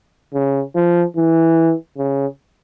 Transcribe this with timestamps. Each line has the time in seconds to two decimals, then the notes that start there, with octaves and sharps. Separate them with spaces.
0.34 C#3
0.75 F3
1.16 E3
1.97 C#3